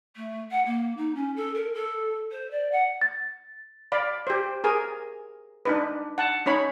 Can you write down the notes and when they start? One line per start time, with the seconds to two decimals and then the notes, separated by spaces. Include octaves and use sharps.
0.16 A3
0.51 F#5
0.66 A#3
0.97 D#4
1.15 C#4
1.36 A4
1.54 A#4
1.74 A4
2.32 C5
2.51 D5
2.72 F#5
3.02 A6
3.92 D5 F5 B5
4.27 G4 C5
4.64 G#4 A#4 G#5
5.65 D4 D#4 B4
6.18 F#5 A5
6.46 C#4 D#4 C#5 B5